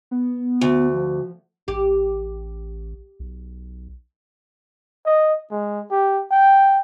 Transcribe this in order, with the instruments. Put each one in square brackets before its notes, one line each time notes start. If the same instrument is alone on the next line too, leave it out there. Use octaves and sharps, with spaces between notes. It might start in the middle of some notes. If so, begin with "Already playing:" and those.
[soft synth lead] B3
[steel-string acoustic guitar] D2
[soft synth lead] F3
[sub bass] A1 [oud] G4
[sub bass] B1
[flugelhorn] D#5
G#3
G4
G5